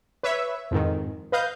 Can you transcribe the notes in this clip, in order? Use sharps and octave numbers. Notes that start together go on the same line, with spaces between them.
B4 C#5 E5
F2 G#2 D#3
B4 D#5 F5 G6